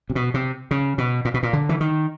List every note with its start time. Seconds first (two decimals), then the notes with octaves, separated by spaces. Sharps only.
0.10 C3
0.15 B2
0.34 C3
0.71 C#3
0.98 B2
1.25 A#2
1.34 B2
1.43 A#2
1.53 D3
1.69 E3
1.80 D#3